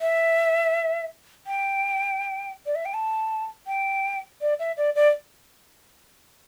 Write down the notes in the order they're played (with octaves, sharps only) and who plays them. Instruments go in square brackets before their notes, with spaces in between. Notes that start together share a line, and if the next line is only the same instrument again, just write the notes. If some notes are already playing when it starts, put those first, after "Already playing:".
[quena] E5
G5
D5
E5
G5
A5
G5
D5
E5
D5
D5